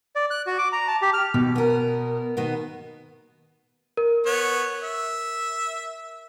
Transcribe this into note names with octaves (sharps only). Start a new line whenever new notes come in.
D5
F#6
F#4
D6
A#5
A5
G4
F6
B2 D#3
B3 A#4
B2 D#3 B3
A#4
B3 C#5
E5